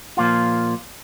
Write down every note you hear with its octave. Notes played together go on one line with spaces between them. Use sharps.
A#2 F3 A#3 F4